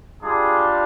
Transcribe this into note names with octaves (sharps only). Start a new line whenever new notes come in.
G3 D4 F4 G#4